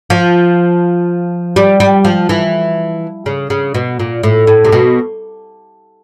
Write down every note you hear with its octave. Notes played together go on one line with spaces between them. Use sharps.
F3
G3
G3
F3
E3
C#3
C#3
B2
A#2
A2
A2
C3
B2